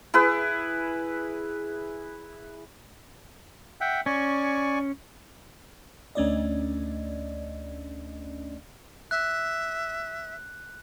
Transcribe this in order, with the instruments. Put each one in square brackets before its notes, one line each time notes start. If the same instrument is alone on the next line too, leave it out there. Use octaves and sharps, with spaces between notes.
[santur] E4 G#4 B4
[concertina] E5 F#5 G5
[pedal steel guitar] C#4 [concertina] D5 G#5 C#6
[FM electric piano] D2 A3 C#4 D4 D5 D#5
[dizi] E5 [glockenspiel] F#6